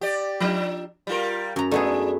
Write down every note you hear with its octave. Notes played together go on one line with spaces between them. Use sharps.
G4 D5
F3 D4
G3 F4 A#4
F#2 A#5
A3 B3 D4 G#4